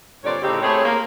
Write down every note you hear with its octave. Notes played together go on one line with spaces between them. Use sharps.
G2 A#2 D3 C4 C#5 D5
A2 C#3 C4 D#4 G4
A3 C4 E4 G#4 C#5
A#3